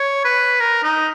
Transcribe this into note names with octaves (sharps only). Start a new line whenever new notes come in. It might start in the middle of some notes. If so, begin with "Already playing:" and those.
Already playing: C#5
B4
A#4
D#4